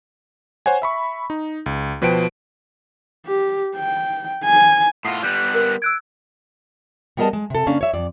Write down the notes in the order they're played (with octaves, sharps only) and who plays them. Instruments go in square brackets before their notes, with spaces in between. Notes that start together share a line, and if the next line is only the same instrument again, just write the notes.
[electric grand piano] C5 C#5 F#5 G#5
E5 B5 C#6
D#4
C#2
B2 F3 B4 C5 G5 D7
[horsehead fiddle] G4
G5
G#5
[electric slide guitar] A2 F4 [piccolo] F#5 [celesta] D#6 C7
[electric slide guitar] G3 B3 [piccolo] F#6 [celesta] G6
[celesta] A#4
[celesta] E6 F#6 G#6 [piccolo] D7
[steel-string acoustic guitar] G3 B3 G#4 A#4 D#5 A5
G#3
C3 A4
C#3 A#3 C#4 D4 F5
C#5 E5
F2 D5